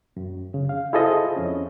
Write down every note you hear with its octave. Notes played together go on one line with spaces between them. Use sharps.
F#2
C#3
F5
E4 F4 G#4 A4 C5 D#5
F2 C#4